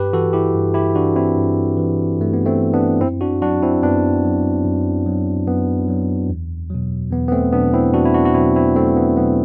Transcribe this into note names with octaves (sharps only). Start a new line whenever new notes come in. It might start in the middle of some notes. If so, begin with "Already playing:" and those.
Already playing: G2 G4 B4
E3 F#4 A4
E4 G4
G2
E4 G4
E3 D4 F#4
C4 E4
G2
E3
G2 A3
B3
A3 C4
E3
B3 D4
F#2 C4 E4
D4 F#4
F#3 D4 F#4
C4 E4
F#2 B3 D4
F#3
F#2
F#3
F#2 B3
F#3
E2
B2 F#3
E2 B3
B3
A3 C4
B2 F#3 B3 D4
C4 E4
E2 D4 F#4
E4
D4 F#4
F#4
B2 F#3 C4 E4
C4 E4
E2 A3 C4
B3
B2 F#3 B3